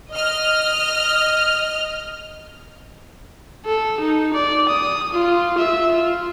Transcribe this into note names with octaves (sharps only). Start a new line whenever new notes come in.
D#5 F6
A4
D#4
D5
D#6
F4
E5
F4